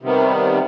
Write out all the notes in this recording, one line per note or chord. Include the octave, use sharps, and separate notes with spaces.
C3 D#3 G3 B3